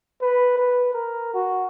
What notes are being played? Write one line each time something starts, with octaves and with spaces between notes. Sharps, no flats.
B4
B4
A#4
F#4